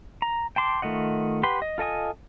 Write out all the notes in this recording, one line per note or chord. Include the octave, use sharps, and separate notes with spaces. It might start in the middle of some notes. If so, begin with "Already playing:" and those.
A#5
G5 A5 C6 D6
D#3 A3 F4 D#5 F#5
G4 B4 F#5 C6
D#5
F4 A4 D#5 G#5 D#6